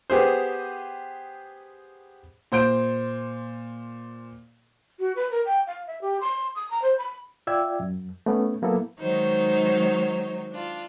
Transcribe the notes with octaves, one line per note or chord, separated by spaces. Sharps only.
B3 G4 G#4 C5
A#2 C5 G6 D7
F#4
B4
A#4
G5
F5
E5
G4
C6
D#6
A#5
C5
B5
F4 D5 E5 G5 E6 G#6
F#2
A3 B3 C#4
F#3 A#3 B3 E4 A4
D#3 F#3 G#3 D#4 C5 C#5
D4 F4